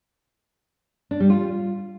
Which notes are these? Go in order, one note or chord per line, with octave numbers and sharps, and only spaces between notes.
D4
G3
F4